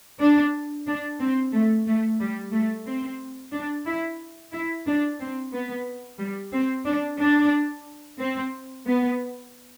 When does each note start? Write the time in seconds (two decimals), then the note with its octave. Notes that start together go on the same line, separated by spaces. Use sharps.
0.20 D4
0.87 D4
1.20 C4
1.52 A3
1.87 A3
2.20 G3
2.53 A3
2.86 C4
3.52 D4
3.86 E4
4.52 E4
4.86 D4
5.20 C4
5.53 B3
6.19 G3
6.52 C4
6.85 D4
7.19 D4
8.19 C4
8.86 B3